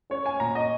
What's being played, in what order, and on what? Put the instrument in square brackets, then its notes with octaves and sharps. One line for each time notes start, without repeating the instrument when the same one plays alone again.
[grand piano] C#4 C#5
G#5
A#2 A#5
D#5